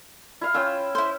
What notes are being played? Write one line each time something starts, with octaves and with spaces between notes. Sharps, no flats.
E4 F5
C#4 F4 G5 E6
E4 C5